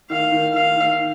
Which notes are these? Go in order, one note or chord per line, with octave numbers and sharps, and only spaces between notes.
D#3 F5
D#3
D#3 F5
D#3